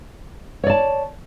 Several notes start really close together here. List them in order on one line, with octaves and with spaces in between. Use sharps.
C#5 D5 A5